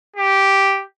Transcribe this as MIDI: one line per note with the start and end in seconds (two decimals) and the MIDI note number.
0.16 0.83 67